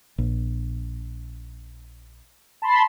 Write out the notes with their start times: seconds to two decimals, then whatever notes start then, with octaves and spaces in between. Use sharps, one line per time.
0.18 A#1
2.62 A5 B5 C6